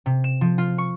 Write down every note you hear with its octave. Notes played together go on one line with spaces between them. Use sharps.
C3
E7
F3
F4
C#6